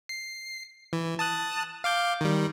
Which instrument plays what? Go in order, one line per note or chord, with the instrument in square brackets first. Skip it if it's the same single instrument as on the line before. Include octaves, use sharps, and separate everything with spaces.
[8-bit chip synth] C7
E3
A5 D#6 F#6
F5 D6 G6
D#3 G3